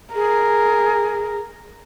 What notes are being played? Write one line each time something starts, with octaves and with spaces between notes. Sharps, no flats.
G#4 A#4